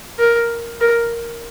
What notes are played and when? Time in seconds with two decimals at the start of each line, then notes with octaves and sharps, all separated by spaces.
0.19 A#4
0.81 A#4